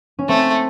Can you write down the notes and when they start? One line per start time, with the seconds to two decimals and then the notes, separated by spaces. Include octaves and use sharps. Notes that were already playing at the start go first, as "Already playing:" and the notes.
0.19 C#4
0.29 A3 C4